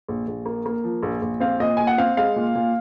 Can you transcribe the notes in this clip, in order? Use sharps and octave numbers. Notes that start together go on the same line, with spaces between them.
A#1
A#1
A#3
A#3
F3
A#1
A#1
C4 F5
A#2 D#5
A#2 G#5
F#5
C4 F5
G#3 F5
A#2
A#2